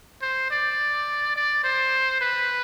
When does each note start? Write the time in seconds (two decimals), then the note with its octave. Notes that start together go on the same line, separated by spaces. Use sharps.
0.22 C5
0.51 D5
1.36 D5
1.64 C5
2.21 B4